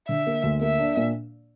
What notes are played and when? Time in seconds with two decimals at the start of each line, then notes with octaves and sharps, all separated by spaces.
0.09 D3 E5
0.27 A#3
0.43 D2
0.61 A#3 E5
0.79 D4
0.97 A#2